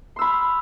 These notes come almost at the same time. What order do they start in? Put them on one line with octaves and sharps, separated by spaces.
C6 E6 B5 F6